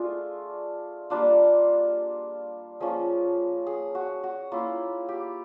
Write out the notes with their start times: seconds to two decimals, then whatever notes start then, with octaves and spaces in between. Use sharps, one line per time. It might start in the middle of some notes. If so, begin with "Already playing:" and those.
Already playing: A3 D4 F4 G#4
1.10 G3 A#3 D4 F4
2.80 F3 A#3 C#4 F4 G#4
3.67 G#4
3.95 F#4
4.23 F#4
4.52 A#3 C#4 E4 F4
5.09 G4